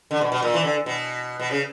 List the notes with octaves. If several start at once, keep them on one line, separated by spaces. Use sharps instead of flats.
D3
B2
B2
A#2
E3
D3
B2
B2
C#3